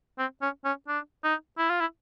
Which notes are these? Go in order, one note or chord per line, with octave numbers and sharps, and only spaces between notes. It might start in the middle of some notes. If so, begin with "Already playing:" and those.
C4
C#4
C#4
D4
D#4
E4
F4
E4